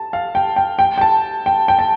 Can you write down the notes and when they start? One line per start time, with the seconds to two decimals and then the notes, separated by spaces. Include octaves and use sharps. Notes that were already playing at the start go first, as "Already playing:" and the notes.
Already playing: A5
0.13 F5
0.35 G5
0.56 G5
0.79 G5
0.98 G5
1.01 A5
1.46 G5
1.68 G5
1.79 A5